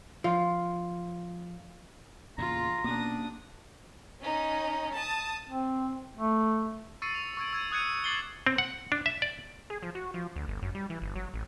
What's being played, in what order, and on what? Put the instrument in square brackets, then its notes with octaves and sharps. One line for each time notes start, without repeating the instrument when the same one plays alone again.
[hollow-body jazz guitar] F3 [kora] F4
[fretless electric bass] E2 A#2 C#3 [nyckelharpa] F4 [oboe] A#5
[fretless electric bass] B2 [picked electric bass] A#3 C#4 [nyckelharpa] D4 D#6
[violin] C#4 D#4
A5 D#6
[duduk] C4
A3
[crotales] C#6 E6 A6 C7 C#7 D#7
F7
C#6 E6 G#6 D7
E6 G#6 D#7
D#6 F#6 G#6 C#7 D#7
D6 F#6 A6 C7 F#7 G7
[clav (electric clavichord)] C4
F#5
D4
E5
D5
[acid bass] G#4
F3
F#4
F3
D2
G1
F#2
G3
E3
G1
F#3
A1